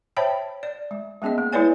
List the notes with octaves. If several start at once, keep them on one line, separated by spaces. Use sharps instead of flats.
C5 C#5 E5 G5 A5 B5
D5
G#3
G#3 B3 C#4 G#4 D#5
A#3
G#3 E4 B4 C#5 D5 G#5